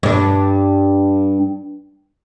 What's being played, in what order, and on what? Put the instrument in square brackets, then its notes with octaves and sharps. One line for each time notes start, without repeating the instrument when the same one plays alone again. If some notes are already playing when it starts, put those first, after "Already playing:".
[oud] G2 D4